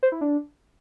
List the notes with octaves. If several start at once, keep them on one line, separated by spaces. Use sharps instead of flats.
C5
E4
D4